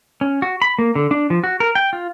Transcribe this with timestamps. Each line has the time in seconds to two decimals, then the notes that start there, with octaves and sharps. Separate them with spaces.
0.21 C#4
0.42 F#4
0.62 B5
0.79 A#3
0.95 D3
1.11 D4
1.30 F3
1.44 F#4
1.60 A#4
1.75 G5
1.93 F4